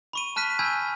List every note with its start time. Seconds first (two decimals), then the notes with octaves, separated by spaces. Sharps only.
0.13 B5 C#6 D#7
0.36 A5 F6 F#6 B6 D#7
0.59 G#5 B5 E6 G6 G#6